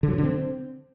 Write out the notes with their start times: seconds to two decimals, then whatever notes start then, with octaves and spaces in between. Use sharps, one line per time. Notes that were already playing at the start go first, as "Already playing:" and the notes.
0.03 D3
0.08 F#3
0.13 B2
0.18 D3
0.23 C4